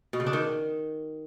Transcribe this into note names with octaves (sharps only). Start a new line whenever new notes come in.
B2
C#3
D4
D#3